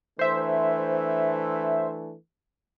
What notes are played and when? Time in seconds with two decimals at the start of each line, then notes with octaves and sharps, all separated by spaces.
0.19 E3 A3 D4 C5 E5